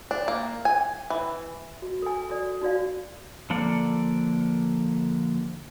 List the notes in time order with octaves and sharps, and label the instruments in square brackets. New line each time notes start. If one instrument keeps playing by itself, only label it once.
[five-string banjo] D4
A#3
G#5
E3
[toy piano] F#4
A4 G#5
F#4 A4 D5
D#4 F#4 D5 F5
[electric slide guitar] D3 F3 A#3 A4 D5